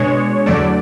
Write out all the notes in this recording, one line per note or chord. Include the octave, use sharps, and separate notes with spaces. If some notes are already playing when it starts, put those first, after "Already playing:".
Already playing: B2 G#3 D4 C#5
E2 D3 F#3 A3 D5